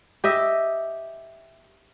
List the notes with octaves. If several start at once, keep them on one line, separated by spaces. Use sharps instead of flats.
G4 D#5 E5